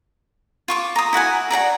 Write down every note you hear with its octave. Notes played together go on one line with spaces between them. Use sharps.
F4 C#6 D6
A#5 D#6
E4 F#4 F#5 G#5
F#4 G#4 D5 A#5